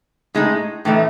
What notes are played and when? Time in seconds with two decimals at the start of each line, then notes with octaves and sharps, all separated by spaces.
0.35 A2 G#3 D#4
0.85 A2 E3 A3 D#4